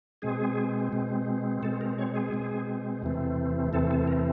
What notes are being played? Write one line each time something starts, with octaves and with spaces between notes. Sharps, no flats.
B2 G#3 C4 G#4
B2 G#3 C4
B2 G#3 C4 A4
A#4
C#5
G#4
B2 G#3 C4
E2 C3 E3 A3 C4
E2 C3 E3 A3 C4 A4
A4
A#4